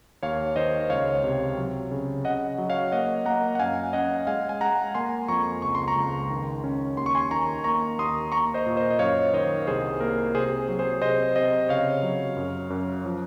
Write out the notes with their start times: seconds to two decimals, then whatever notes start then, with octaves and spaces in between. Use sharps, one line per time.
0.23 D#2 C#5 F5
0.56 D#3 C5 D#5
0.90 C#2 C#5 F5
1.24 C3
1.57 F#3
1.91 C#3
2.25 C#3 D#5 F#5
2.58 F#3
2.69 C#5 F5
2.92 A#3 D#5 F#5
3.26 A#3 F#5 A#5
3.55 F#5
3.60 F#2 F5 G#5
3.93 C#4 D#5 F#5
4.27 G#3 F5 G#5
4.49 G#5
4.61 G#3 F#5 A#5
4.95 A#3 G#5 C6
5.28 F2 A#5 C#6
5.62 C#2 C#6
5.75 C6
5.88 A#5 C#6
5.96 C#2
6.30 D#3
6.64 C#4
6.97 D#2 C6
7.06 C#6
7.15 G#5 C6
7.31 D#3 A#5 C#6
7.64 A#3 A#5 C#6
7.98 D#2 C6 D#6
8.32 A#3 A#5 C#6
8.54 C5 D#5
8.66 A#2
8.77 C5 D#5
8.90 D#5
8.99 F#2 C#5 F5
9.33 D#3 C5 D#5
9.67 C2 G#4 C5
10.00 A#3 A#4
10.34 C3 G#4 C5
10.69 F#3
10.79 G#4 C5
11.02 C3 C5 D#5
11.36 C3 C5 D#5
11.69 C#3 C#5 F5
12.03 F#3
12.36 F#2
12.70 F#2
13.05 F3